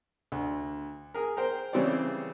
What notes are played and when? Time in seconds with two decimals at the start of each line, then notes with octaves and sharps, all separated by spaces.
0.32 D2
1.14 G#4 A#4
1.37 A#4 C5 G5
1.73 C#3 E3 G3 C4 C#5 D5